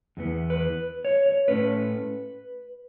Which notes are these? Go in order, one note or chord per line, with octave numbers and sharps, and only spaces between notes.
E2 E3 B3
B4
C#5
C#5
A2 A3 C#4 B4